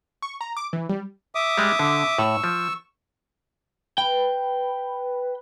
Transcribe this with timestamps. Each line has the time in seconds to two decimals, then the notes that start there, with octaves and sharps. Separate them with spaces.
0.22 C#6
0.41 A#5
0.57 D6
0.73 E3
0.89 G3
1.35 E5 D6 D#6
1.58 G3 G#3
1.79 D3
2.18 A2 C#6 E6
2.44 F3
3.98 B4 G5